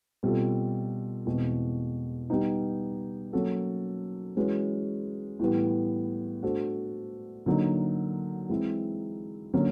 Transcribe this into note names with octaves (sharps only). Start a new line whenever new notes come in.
B2 G3 C4 F4 A4
E2 B2 G#3 C4 E4
G3 B3 D#4
F#3 A#3 C#4 F#4 A4
E3 G#3 C#4 F#4 B4
A2 E3 G3 B3
A3 D4 F#4 A4 C5
D3 F#3 A#3 D#4
E3 G#3 C4 E4
D3 F#3 A#3 C#4